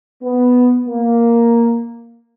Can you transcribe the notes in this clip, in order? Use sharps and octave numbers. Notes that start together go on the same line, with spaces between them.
B3
A#3